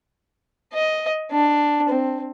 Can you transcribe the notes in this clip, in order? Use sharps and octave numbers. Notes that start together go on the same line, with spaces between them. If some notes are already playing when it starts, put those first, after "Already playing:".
D#5
D4
C4